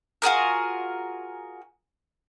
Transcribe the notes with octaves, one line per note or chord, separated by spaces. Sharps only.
F4 F#4 G#4 A#4